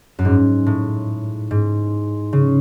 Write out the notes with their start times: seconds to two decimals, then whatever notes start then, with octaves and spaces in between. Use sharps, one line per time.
0.19 F#2
0.25 G#2
0.66 A2
1.51 G#2
2.33 C#3